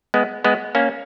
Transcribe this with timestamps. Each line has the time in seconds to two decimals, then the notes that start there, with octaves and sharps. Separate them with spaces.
0.14 G#3 B3
0.44 G#3 B3
0.75 A#3 C#4